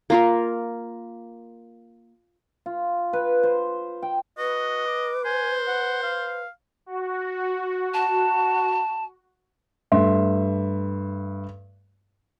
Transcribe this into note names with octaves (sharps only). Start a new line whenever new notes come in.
A#3 F4 A#4
F4
B4
C5
G5
F#4 B4 D#5
D6
C5 G#5
F#5
F5
F#4
A5
G2 A3 E5 C6